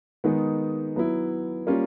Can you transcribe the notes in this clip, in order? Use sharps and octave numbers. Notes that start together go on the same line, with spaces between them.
D#3 G#3 B3 D#4
F#3 B3 E4
G3 A#3 C#4 F4